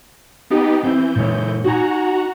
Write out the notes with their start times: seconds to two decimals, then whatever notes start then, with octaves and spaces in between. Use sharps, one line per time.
0.50 B3 D#4 G4
0.83 E3 C4 G6
1.16 A#2 G#3 C#5
1.64 D#4 F#4 F#5 G#5 A#5